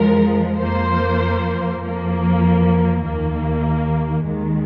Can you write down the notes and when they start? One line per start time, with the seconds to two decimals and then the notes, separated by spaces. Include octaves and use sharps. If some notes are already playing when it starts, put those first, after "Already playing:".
Already playing: F2 F3 G#3 A#4
0.59 F2 F3 A#3 C5
1.81 F2 F3 A#3
3.03 D#2 D#3 A#3
4.24 D#2 D#3 G#3